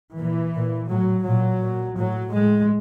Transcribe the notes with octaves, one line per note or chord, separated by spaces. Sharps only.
A#2 E3
A#2
A2 F#3
A#2 F#3
A#2
A2 F#3
A2 G#3